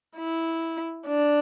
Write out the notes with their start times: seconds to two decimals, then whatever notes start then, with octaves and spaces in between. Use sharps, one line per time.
0.17 E4
1.07 D4